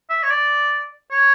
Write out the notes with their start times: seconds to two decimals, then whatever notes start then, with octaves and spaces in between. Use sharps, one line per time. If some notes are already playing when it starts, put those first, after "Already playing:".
0.10 E5
0.23 C#5
0.30 D5
1.12 C#5